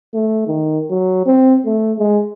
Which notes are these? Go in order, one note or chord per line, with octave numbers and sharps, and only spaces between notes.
A3
D#3
F#3
C4
A3
G#3